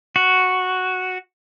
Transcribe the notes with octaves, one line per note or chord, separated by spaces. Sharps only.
F#4